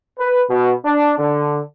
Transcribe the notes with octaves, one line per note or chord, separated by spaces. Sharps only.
B4
B2
D4
D3